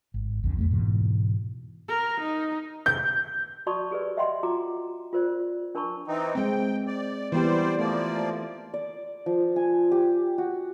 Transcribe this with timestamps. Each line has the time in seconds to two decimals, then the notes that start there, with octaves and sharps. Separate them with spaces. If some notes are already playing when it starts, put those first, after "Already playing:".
0.14 G#1
0.43 A#1 F2 D3
0.56 E2 G3 A3
0.71 G#2 B2 E3
1.89 A#4
2.20 D#4
2.86 G6
3.67 F#4 D5 A5 B5 C#6 D#6
3.91 G4 G#4 A#4 B4 D5
4.17 D#5 E5 F#5 G5 B5 C6
4.43 F4 F#4 A#5 D6
5.13 F4 A#4 C5 D5
5.75 D4 A#4 A5 B5 C#6
6.08 E3 C4 D#4
6.35 G#3 C4 G5
6.87 D5
7.32 E3 G3 B3 G4 C5 D5
7.79 F3 A3 A#3 D5
8.74 D5
9.26 F3
9.56 G#5
9.92 G4
10.38 F#4